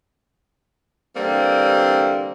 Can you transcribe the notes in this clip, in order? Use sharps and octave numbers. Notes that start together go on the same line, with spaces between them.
D3 E3 G3 A#3 C4